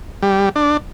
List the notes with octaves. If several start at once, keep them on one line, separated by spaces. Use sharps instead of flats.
G3
D4